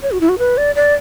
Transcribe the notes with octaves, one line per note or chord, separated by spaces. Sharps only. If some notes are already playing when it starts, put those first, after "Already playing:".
C#5
F#4
E4
F#4
B4
D5
D5